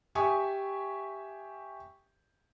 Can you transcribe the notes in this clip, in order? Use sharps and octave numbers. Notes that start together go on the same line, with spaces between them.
G4 E5 G#5 C#6 D#6